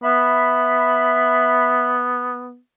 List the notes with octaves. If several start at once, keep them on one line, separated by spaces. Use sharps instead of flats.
B3 E5 B5